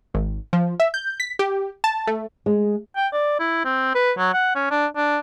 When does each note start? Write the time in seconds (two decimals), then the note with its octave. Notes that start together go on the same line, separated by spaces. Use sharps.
0.14 G#1
0.53 F3
0.80 E5
0.94 G6
1.20 B6
1.39 G4
1.84 A5
2.07 A3
2.46 G#3
2.96 G5
3.13 D5
3.39 E4
3.65 C4
3.95 B4
4.18 F#3
4.34 F#5
4.55 C#4
4.71 D4
4.97 D4